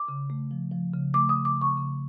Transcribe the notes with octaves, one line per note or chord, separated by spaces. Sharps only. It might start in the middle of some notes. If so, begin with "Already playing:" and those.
Already playing: D6
C#3
A3
F3
F3
C#3
A3 D6
D#6
C#3
D6
C#3 C#6
C#3